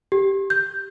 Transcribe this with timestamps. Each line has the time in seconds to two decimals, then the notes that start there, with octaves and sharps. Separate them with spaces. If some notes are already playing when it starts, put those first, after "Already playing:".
0.12 G4
0.50 G6